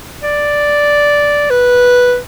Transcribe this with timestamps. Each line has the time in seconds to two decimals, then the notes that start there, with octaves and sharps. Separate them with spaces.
0.22 D5
1.50 B4